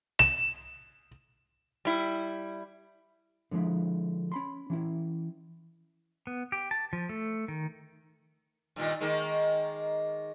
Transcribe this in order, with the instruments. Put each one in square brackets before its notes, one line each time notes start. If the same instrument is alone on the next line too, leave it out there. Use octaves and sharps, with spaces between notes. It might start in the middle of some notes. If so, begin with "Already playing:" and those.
[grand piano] E7
[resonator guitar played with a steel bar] G3 E4
[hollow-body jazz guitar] D3 F3 F#3 G#3 E4
C#4 B5 C6
E3 C#4 E4
[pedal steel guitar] B3
G4
A5
F3
A3
D#3
[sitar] G2 A#2 D#3
D#3 G#3 A#3